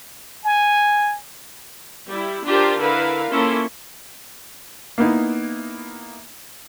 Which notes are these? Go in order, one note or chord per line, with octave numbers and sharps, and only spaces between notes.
G#5
G3 E4
D4 F4 G4 A#4 C5
D3 E4 A#4 B4 F5
A#3 C#4 E4 F4 A4 C6
A#3 B3 D#4 E4